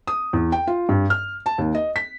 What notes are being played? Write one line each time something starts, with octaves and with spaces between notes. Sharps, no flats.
D#6
E2
G5
F4
G2
F6
A5
D#2
D#5
B6